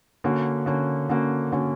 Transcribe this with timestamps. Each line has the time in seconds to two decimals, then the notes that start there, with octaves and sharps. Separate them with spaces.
0.24 D3 A#3 C#4 F#4
0.66 D3 A#3 C#4 F#4
1.09 D3 A#3 C#4 F#4
1.52 D3 A#3 C#4 F#4